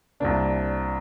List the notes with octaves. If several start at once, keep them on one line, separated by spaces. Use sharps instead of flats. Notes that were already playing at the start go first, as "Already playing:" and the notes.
C2 C3 A#3 D4